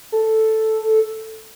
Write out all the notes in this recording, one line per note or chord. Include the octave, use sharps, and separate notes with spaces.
A4